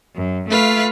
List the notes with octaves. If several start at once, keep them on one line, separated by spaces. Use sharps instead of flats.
F#2
A3 F4 B4 F5